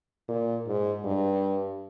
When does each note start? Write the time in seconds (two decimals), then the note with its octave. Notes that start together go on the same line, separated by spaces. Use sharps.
0.28 A#2
0.67 G#2
1.05 G2